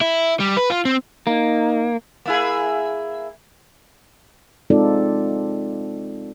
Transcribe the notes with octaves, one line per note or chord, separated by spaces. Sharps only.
E4
G3
B4
F4
C4
A#3 D#4
A#3 E4 G#4
G#3 C4 D#4 F4 A4 D5